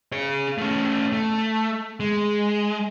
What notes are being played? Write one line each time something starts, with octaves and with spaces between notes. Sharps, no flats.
G#4 C#5
A3 C#4
A3
G#3